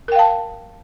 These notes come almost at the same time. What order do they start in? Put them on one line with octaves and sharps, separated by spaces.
A#4 G5 F5 A5